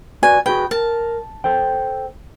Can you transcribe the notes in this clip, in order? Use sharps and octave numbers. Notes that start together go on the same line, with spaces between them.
F#4 B4 D5 G#5
F#4 G#4 B4 G5
A#4 A5
A4 C5 G5